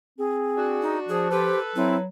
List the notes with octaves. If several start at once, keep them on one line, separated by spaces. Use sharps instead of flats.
C4 G#4
D4 F#4
D#4
F3 G#4
G4 A4 B4 C5
F#3 C4 E4